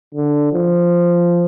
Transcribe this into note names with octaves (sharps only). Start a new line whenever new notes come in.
D3
F3